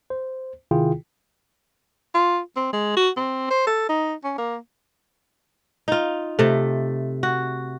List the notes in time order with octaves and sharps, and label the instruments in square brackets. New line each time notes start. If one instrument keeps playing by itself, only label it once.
[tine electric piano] C5
C3 D#3 E4 F4 G#4 G5
[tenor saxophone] F4
C4
G#3
F#4
C4
C5
A4
D#4
C#4
A#3
[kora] D#4 F4
C3 A3
F#4